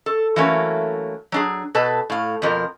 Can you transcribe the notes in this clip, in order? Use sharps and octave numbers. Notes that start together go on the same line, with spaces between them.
A4
E3 F#3 A3 A#3 C#4
F#3 D4 G#4
B2 A4 B4 A5
A2 F5
F2 B2 F3 A#4